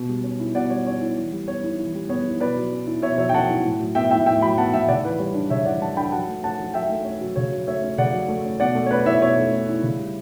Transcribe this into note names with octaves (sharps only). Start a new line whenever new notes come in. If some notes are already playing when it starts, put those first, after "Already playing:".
Already playing: B2
G3
C#4
E4
B2 D5 F#5
G3 C#5
C#4 C#5
E4
E3
G3
B3 C#5
E4
E3
G3
B3 C#5
E4
B2 B4 D5
F#3
C#4
E4
B2 C#5 E5
F#3 C#5 E5
G5
C#4 F#5 A5
E4
A2
F#3
B3 E5 G5
A2 E5 G5
A2 E5 G5
F#3 G5 B5
B3 F#5 A5
A2 E5 G5
C#3 D5 F#5
E3 B4
G3 C#5
D4
C#3 C#5 E5
E3 D5 F#5
G3 F#5 A5
D4 G5 B5
F#3 F#5 A5
A3
C#4 F#5 A5
F#3
F#3 E5 G5
A3
C#4 C#5
F#3
C#3 C#5
F#3
A3 C#5 E5
C#4
C#3 D5 F#5
F#3
A3
C#4
B2 D5 F#5
A3
C#5
C#4 B4 D5
E4 C#5 E5
B2 C#5 E5
A3
C#4
E4
C#3
G3